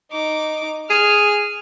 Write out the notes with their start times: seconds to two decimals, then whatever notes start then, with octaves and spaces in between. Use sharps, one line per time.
0.11 D#4 D6
0.90 G#4 F6